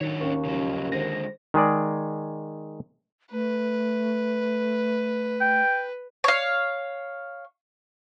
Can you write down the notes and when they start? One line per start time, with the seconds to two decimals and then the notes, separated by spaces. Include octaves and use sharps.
0.01 D#3 D4 F#4 C#5
0.21 D#2 C#4
0.45 C#3 F3 F#3
0.92 D3 D#3 G#3 C5 A#6
1.54 D#3 G#3 G#4 D5
3.32 A3 B4
5.41 G5
6.24 C#5 F5